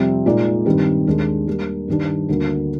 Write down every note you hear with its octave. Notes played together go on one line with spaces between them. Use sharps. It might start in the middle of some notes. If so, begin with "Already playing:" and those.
Already playing: F2 C3 G3 C4
A#2 G#3 D#4 A#4 D5
G2 D#3 G3 C4
D#2 D#3 G#3 D4
G3 A#3 D4
G2 D#3 G3 D4
D2 D3 G3 A#3